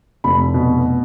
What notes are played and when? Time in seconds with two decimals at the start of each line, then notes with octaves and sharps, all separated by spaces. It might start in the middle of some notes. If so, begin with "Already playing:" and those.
0.24 F1 B5
0.54 B2